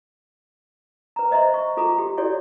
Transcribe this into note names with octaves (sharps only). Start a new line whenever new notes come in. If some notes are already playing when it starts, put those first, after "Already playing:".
B4 A#5
C5 D#5 E5 A#5 C6
C#6
F4 A4 A#5 B5 D6
G4
E4 F#4 G4 A4 C#5 D5